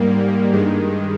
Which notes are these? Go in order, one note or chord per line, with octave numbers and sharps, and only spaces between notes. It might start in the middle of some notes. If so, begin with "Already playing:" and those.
Already playing: G#2 G3 A#3
G2 D#3 G#3